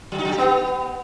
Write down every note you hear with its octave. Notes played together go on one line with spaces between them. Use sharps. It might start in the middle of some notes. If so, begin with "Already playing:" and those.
F#3
D#4
F#3
G4
B3